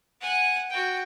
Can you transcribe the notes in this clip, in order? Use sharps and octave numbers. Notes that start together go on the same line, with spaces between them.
F#5 G#5
F#4 G5